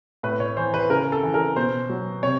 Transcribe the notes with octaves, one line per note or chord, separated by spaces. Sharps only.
A2 B4
C#5
E3 C5
B4
C#3 A#4
A4
E3
A#4
B2 C5
F#3
C3 C#5